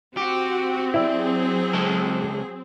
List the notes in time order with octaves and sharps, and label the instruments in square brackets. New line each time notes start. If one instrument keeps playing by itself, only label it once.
[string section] C4 [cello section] F#4 [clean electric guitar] G4
[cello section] F#3 G#4 [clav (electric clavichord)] E4 D5
[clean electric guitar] C#2 G#3 A4